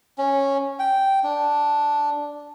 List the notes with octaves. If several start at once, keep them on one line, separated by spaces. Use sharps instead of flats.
C#4
G5
D4